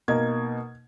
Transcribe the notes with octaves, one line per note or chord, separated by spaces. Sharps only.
B2 A#3 D#4 G#6